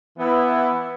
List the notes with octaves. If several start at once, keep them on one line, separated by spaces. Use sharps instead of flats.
E3 B3 E4